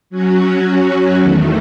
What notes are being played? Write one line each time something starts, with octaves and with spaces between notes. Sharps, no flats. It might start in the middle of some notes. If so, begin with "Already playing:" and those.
F#3 C#4 F#4
E2 D#3 A3